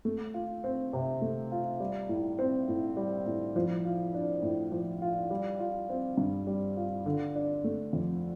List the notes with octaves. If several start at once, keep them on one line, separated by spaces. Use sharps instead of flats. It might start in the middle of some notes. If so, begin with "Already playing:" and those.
A3
F4
C4
C3
A3
F4
G3
A2
C4
A2
G3
A2
F3
F4
D4
A2
F3
F4
G3
F4
C4
G2
G3
F4
D3
D4
A3
F2